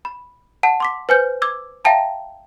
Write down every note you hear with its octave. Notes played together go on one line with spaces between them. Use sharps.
B5
F#5 A5
C6 D6 B6
B4 C5 G#5 F6 G6
D6 E6 G#6
E5 F5 G5 A5 A#5